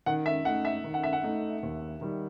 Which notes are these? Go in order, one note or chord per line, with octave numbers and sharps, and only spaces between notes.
D#3 F#5
E5
A3 D#4 F#5
E5
D#3
F#5
E5
F#5
A3 D#4
D#2
D#3 G3